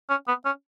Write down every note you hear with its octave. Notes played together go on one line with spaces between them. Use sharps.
C#4
B3
C#4